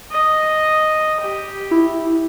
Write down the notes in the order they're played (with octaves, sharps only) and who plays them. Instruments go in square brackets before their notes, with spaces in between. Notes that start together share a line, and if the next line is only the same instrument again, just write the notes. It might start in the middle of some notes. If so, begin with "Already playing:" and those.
[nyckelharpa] D#5
G4
[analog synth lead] E4